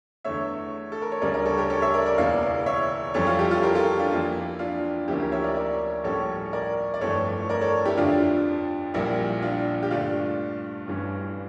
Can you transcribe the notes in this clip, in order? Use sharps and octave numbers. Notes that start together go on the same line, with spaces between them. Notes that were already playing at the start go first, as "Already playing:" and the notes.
E2 D3 A3 C#5 E5
A4
A#4
C#5
D2 C#3 G3 C#4 A#4 D5
A#4 D5
A4 C#5
G4 A#4
A4 C#5
C#5 E5
A#4 D5
A#4 D5
E1 E2 C#3 E3 A#3 D5 F5
C#5 E5
F2 E3 G3 C#4 A4 C#5
F4 A4
E4 G4
F4 A4
G4 A#4
F4 A4
D4 F4
F2 E3 A#3 E4
D4 F4
D2 D3 F3 A#3 C#4 E4 G4
G4 A#4
C#5 E5
A#4 D5
A#4 D5
A#1 A2 G3 C#4 A4 C#5
A#4 D5
D5
G1 F2 E3 A3 A4 C#5
A#4 D5
A4 C#5
E4 G4
F2 D3 F3 D4 F4
A#1 A#2 G3 A#3 E4
D4 F4
G4
G2 D3 A3 D4 F4
G1 G2 E3 G3 C#4